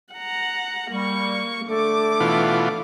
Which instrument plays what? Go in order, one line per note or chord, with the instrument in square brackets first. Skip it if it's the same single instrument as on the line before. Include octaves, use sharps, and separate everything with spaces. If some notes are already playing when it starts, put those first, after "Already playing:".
[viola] F#5 A#5
[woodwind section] G3 [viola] A#3 C#6
[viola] D3 D6 [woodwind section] A3 A4
[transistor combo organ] B2 E3 F4